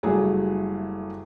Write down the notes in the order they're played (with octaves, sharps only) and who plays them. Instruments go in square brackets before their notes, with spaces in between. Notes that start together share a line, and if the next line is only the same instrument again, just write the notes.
[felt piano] F#1 F#3 G3 A3 G#4